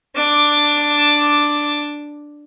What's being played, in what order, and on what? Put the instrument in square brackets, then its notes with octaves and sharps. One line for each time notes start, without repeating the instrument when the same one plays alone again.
[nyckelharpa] D4 D6